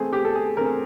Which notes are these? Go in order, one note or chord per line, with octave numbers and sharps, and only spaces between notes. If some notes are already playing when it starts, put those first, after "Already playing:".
Already playing: E3 A3 C4 G#4
G4
A4
G#4
E3 A3 C4 A#4